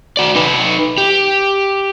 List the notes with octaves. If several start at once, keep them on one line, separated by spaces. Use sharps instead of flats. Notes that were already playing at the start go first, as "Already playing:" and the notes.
F#4 D5
D#4 B4
G4